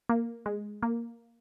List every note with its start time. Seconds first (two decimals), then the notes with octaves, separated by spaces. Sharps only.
0.09 A#3
0.46 G#3
0.83 A#3